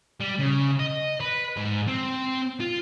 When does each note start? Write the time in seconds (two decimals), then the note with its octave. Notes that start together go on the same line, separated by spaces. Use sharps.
0.20 G3
0.39 C#3
0.79 D#5
1.21 B4
1.56 G#2
1.88 C4
2.60 F4